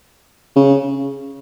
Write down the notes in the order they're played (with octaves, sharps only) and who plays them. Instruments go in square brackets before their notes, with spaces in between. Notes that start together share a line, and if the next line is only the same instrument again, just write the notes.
[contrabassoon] C#3